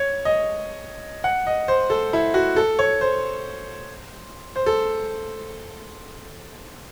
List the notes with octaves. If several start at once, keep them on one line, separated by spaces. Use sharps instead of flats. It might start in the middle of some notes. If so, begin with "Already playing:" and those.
Already playing: C#5
D#5
F#5
D#5
C5
A4
E4
F#4
A4
C#5
C5
C5
A4